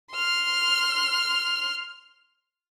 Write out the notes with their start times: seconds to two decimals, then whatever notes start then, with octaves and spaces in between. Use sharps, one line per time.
0.13 C6 F6